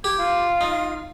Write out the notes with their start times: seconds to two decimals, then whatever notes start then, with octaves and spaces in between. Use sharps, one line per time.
0.04 G4 G#6
0.18 F4
0.61 D#4